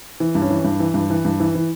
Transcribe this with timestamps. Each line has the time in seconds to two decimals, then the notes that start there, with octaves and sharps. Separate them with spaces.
0.20 E3
0.35 G2
0.42 C#4
0.50 E3
0.65 G2
0.80 E3
0.94 G2
1.10 E3
1.25 G2
1.40 E3
1.55 E3